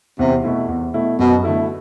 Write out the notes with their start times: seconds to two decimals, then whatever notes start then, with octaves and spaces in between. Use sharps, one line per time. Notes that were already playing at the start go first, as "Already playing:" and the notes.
0.19 E2 C3
0.44 B2 A3 E4
0.68 E2
0.94 B2 A3 E4
1.19 F#2 B2
1.43 D3 A3 E4 A4